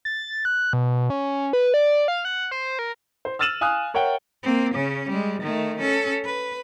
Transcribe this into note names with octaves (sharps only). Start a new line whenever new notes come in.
A6
F#6
B2
C#4
B4
D5
F5
F#5
C5
A#4
C5
E6 F6 A6 D#7 E7 F#7
F5 G#5 D#6 F6 F#6
A#4 C#5 E5 F#5 G5
A#3 C4
C#3 C#4
G3 G#3
D#3 A3
C#4 A4
B4